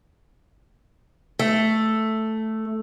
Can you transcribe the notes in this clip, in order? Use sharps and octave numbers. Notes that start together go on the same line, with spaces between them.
A3